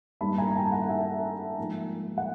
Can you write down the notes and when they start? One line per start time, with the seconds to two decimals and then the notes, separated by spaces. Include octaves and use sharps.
0.21 G2 D#3 G3 A#3 A5 B5
0.38 G#5 A#5
0.51 A#5
0.55 G5 A5
0.66 A5
0.72 F#5 G#5
0.89 E5 F#5
1.58 G#2 F3 A#3
2.18 F#5